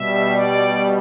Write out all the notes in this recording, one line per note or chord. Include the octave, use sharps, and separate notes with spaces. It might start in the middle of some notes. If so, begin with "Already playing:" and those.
Already playing: B2 G3 E5
D5